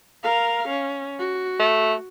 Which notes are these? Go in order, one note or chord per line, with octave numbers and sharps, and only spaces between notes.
A#4 F5
C#4
F#4
A3